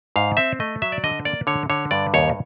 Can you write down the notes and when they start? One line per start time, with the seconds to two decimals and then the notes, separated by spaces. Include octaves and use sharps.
0.16 G#2 F5
0.37 C4 E5
0.60 A3 D#5
0.82 F#3 E5
0.92 D5
1.04 D3 D#5
1.25 A#3 D5
1.47 D3 C#5
1.70 D3 C#5
1.91 G2 D5
2.14 D#2 C#5